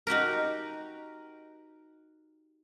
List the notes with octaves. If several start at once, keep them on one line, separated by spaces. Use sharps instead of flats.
D#4 F#4 G4 A#4